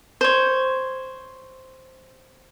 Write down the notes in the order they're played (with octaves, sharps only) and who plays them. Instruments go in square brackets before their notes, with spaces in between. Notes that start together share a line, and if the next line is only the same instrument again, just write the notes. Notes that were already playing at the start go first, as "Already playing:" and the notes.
[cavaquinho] C5 C#5